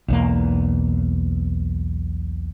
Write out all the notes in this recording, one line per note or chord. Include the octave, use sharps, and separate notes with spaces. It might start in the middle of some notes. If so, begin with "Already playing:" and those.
B1 E2 A#3